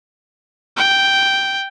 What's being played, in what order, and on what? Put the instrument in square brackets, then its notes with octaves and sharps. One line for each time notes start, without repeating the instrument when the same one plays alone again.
[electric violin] G5